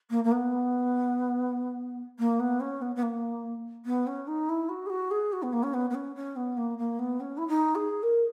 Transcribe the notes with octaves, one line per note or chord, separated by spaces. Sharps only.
A#3
A#3
B3
A#3
B3
C#4
B3
B3
A#3
B3
C#4
D#4
E4
F#4
G#4
F#4
G#4
F#4
B3
A#3
C#4
B3
B3
C#4
C#4
B3
A#3
A#3
B3
C#4
E4
D#4
G#4
A#4